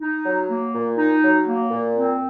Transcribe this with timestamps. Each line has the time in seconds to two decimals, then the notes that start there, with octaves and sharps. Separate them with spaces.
0.01 D#4
0.25 F#3
0.50 A#3
0.74 A#2
0.98 D#4
1.23 F#3
1.46 A#3
1.71 A#2
1.95 C4